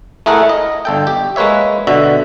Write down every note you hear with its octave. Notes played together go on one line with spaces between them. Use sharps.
A3 E4 G#4 A#4 F#5
D#5
G1 A4 G5
G4
G#3 A#3 B4 C#5 E5
B2 D3 F#4 E5